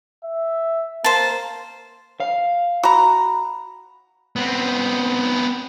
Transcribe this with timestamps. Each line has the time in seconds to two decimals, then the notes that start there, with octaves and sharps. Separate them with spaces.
0.24 E5
1.04 A#3 C5 A5
2.20 F5
2.83 F#4 A#5 B5
4.36 B3 C4